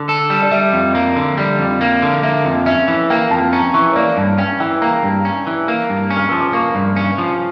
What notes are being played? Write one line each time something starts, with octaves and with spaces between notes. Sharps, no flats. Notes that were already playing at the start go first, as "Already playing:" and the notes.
Already playing: D3
A4
G3
D5
G3 E5
F2
A#3
D3
G3 D5
F2
A#3
D3
A#3 E5
F2
C#4 E5
E3
A#3 G5
F2 A5
C#4 A#5
E3 C#6
C#5
A#3 D5
G2 A5
C#4 G5
E3 G5
A#3 A#5
G2
C#4
E3
A#3
G2
C#4
F6
F3 E6
D6
A#3 C#6
G2
C#4
F3